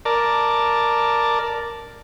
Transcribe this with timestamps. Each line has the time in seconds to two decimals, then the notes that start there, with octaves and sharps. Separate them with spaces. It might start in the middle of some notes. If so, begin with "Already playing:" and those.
0.05 A#4 D5 A5